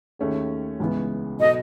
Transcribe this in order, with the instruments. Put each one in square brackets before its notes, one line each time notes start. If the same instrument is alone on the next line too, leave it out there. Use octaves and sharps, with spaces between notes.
[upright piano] D#2 D#3 A3 C#4 G#4
C#2 C#3 E3 B3
[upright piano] B2 F#3 B3 F#4 A4 [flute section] D#5